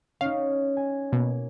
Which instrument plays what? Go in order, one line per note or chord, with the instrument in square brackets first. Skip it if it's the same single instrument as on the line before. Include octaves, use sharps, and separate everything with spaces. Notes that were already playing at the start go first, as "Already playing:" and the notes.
[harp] C#4 D#4 [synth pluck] F5
[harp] G#5
[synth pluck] B2 [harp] A#3